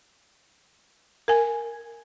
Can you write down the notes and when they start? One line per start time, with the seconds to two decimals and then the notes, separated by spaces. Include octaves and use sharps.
1.28 A#4 G#5